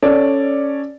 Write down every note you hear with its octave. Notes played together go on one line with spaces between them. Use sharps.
C#4 A4 D5